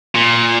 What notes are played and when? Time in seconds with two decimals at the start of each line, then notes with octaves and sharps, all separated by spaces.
0.15 A#2